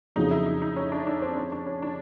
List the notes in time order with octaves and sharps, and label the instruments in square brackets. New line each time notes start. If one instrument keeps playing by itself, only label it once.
[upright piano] F2 C#3 F#3 [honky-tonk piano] D#4
[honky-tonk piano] E4
D#4
D#4
C#4
D4
D4
C4
C#4
D4
C#4
D4